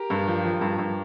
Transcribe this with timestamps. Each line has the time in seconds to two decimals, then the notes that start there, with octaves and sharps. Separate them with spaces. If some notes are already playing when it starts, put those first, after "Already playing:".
Already playing: G4 A#4
0.10 G2
0.27 F3
0.44 F3
0.61 G2
0.78 G2